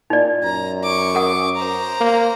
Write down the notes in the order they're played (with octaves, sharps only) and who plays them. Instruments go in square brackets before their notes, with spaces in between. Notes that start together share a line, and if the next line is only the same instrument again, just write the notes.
[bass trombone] A#2 [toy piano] D#4 D5
[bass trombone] F#2 [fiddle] A#5
[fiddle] C#6 D6
[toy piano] A#4 F#5 D#6
[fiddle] C5 A#5
[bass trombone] A#3